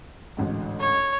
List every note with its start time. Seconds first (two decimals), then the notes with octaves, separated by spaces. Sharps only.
0.37 A1 D2 G#2
0.80 C#5